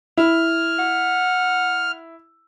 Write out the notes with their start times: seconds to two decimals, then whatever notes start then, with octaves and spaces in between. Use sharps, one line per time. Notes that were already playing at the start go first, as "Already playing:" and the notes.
0.17 E4 F6
0.79 F#5